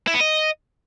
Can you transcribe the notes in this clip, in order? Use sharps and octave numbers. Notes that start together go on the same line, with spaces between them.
E4
B3
D#5